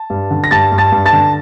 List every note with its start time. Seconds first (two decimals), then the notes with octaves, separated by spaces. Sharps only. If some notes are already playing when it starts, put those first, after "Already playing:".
Already playing: A5
0.10 G2
0.31 D3
0.44 A#6
0.51 G2 A5 A6
0.72 G2
0.78 A5 A6
0.92 G2
1.06 A5 A6
1.13 D3